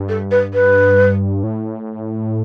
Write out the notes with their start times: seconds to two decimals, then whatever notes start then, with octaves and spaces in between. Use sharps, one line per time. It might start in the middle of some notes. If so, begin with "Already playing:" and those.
Already playing: G2
0.09 A4
0.31 B4
0.54 B4
1.44 A2